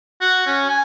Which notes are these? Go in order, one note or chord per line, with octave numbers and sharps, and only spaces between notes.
F#4
C#4
G#5